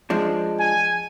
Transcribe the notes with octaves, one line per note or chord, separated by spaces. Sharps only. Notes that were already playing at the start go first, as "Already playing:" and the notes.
F3 G#3 D4
G#5